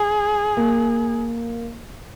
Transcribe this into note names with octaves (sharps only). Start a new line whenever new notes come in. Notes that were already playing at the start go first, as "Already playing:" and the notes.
Already playing: G#4
A#3